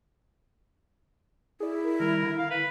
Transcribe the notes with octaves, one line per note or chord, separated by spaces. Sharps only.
E4 G#4 D5
A#4
D#3 G3 A#4
D3
F5
B4